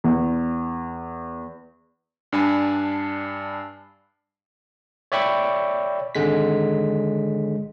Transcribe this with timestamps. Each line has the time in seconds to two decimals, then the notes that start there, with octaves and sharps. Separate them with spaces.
0.04 E2
2.32 G2 D4 G#5 A5 B5
5.12 C#5 D5 E5 G5 B5 C#6
6.15 G#1 D3 G#3 B6